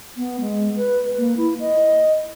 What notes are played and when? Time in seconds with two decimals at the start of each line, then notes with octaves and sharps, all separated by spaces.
0.17 B3
0.41 G#3
0.76 B4
1.18 A#3
1.37 E4
1.60 D#5